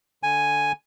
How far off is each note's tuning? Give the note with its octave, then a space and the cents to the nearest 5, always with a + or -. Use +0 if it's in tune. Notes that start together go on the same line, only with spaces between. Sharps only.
D3 +0 G#5 +0